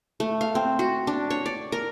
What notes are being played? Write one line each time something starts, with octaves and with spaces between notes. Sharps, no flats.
A3
F5
C4
F#4
D4
C#5
D5
A#4